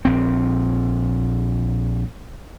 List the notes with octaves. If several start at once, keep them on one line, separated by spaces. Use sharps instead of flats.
A#1 C4